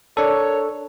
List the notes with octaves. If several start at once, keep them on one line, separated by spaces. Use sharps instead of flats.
D4 A4 A#4 C#5